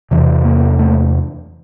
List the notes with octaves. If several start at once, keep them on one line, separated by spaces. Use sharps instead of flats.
E2 C3 E3
A#3
A3